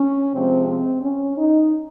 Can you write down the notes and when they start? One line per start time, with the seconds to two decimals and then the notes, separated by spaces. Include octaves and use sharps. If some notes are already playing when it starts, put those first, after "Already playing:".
Already playing: C#4
0.31 C3 F3 G#3 C4
0.66 C4
1.01 C#4
1.36 D#4